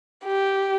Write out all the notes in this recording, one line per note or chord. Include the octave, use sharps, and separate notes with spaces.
G4